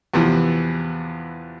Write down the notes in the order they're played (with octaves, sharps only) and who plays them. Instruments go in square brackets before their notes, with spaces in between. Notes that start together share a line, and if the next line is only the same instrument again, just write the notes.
[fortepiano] E2 C3 E3 F3 B3